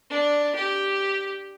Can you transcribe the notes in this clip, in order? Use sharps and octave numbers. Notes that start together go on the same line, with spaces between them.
D4
G4